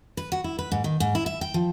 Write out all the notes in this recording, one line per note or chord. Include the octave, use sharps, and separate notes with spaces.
B4
F#4
E4
B4
G#2
D#3
G#2
E4
E5
G5
F3